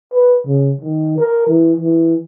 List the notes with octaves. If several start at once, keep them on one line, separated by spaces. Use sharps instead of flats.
B4
C#3
D#3
A#4
E3
E3